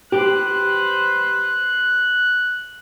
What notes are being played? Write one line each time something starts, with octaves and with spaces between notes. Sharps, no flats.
G4 B4 C5 F#6